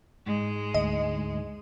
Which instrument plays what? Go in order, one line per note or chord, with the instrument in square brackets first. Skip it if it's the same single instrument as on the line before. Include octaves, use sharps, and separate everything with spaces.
[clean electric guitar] G#2 [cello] G#3
[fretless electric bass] D2 [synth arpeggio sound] D#5